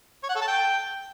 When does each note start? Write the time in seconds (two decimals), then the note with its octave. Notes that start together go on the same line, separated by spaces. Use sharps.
0.23 C#5
0.29 F#5
0.35 A4
0.42 A5
0.48 G5